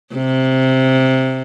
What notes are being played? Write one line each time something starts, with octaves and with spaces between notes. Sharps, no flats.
C3